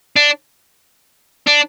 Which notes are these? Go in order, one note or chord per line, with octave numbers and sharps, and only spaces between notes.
D4
D4